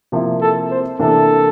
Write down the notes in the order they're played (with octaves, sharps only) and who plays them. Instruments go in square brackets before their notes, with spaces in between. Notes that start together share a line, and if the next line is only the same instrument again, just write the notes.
[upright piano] C3 F3 A#3 E4
[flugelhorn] A4
C5
[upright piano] C3 E3 A#3 D4 [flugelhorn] A4